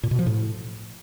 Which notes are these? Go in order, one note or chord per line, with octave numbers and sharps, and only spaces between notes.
A#2
B2
F3
A2